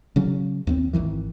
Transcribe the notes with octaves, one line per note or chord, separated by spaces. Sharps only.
C#3 F#3 C#4
D#2 B3 C4
G#1 E2 D#3 E3